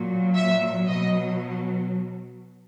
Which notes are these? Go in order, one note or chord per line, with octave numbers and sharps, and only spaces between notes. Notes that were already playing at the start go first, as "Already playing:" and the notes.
Already playing: A#2 F#3
E5
B2 F#3 D#5